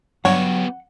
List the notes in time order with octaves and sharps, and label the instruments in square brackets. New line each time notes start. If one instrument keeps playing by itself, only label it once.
[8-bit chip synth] G2 C#5 [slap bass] F#3 [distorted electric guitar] B3 G4 [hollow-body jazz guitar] F#5